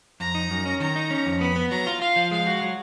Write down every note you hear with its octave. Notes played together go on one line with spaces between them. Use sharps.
F2 A#5
D#4
F#2
C#4
D#3 A#5
D#4
C#4
F2
B3 B5
B3
F#3 A#5
F4
F4 F5
F3
G#3 F5
F#4
F#3